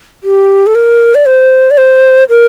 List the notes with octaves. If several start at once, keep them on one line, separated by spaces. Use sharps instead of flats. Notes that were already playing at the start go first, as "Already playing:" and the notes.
G4
A4
A#4
D5
C5
D5
C5
A#4